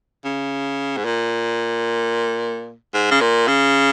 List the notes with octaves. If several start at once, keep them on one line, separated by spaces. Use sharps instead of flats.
C#3
G#2
A#2
G#2
C#3
A#2
C#3